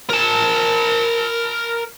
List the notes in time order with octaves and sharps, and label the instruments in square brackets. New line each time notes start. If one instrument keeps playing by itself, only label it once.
[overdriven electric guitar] A#4 A5